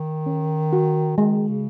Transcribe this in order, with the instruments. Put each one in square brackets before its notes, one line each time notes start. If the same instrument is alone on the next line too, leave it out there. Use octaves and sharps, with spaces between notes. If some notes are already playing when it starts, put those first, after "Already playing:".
Already playing: [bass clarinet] D#3
[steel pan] C#4
F#4
[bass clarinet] D#3 [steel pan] G#3
[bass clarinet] C#3